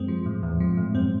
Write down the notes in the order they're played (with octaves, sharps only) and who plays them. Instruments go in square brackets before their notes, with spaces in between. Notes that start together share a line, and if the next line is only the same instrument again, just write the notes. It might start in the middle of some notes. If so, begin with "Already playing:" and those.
Already playing: [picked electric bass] F#2 [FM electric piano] G#3 C4
[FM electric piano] F3
A2
[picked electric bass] E2 [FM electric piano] A2
[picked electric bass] F2 [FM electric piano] F3
[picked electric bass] F2 [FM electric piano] A2
[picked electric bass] F#2 [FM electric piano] C4